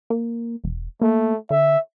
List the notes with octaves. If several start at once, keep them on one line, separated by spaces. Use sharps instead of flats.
A#3
E1
A3 A#3
D3 E5